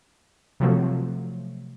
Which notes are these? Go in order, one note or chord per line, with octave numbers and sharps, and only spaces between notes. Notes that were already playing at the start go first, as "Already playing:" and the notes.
C3 F3 F#3 A3